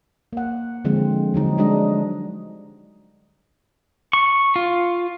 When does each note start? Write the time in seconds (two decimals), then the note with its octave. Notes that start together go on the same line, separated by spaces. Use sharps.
0.33 A#3 F#5
0.85 D3 F3 G#3 C4
1.34 D3 F#3 D#4
1.58 G3 G#3 D4 F#4 D#5
4.13 C#6
4.56 F4